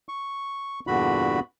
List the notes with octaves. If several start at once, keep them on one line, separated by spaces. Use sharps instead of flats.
C#6
E2 G2 A#2 D3 F#4 B5